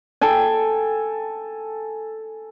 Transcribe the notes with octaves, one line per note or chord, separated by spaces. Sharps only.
A4 G5 G#5